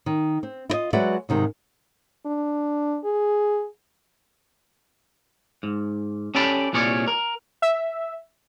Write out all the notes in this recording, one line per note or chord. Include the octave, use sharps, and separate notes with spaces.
D#3
C4
E4 F4 D#5
F#3 G#3 F#4 B4 D5 E5
G#2 C3 D#3
D4
G#4
G#2
C#4 G4 A4 D5 A5 B5
C2 A#2 C#4 G#4 C#5 D5
A#4
E5